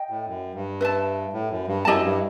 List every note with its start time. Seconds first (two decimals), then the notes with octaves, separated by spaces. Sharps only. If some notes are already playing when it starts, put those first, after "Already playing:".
Already playing: D#5 G5
0.10 A2
0.28 F#2
0.55 G2
0.81 B4 E5 A5
1.33 A2
1.50 F#2
1.68 G2
1.85 F#2 E4 G4 D#5 A5
2.03 G2